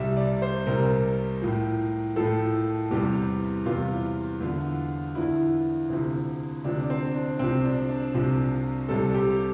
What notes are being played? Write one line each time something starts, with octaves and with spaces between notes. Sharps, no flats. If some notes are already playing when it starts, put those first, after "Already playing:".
Already playing: C2 C3 G3 E5
D5
C5
C2 C3 G3 A#4
A2 F3
A2 F3 A4
E2 C3 E3 G3 G4
E2 C3 E3 G3 F4
E2 D3 F3
E2 D3 F3 E4
D2 C3 F3
D2 C3 F3 D4
D4
C4
D4
C2 C3 F3 C4
D4
D4
C2 C3 F3
C2 C3 G3 A4
G4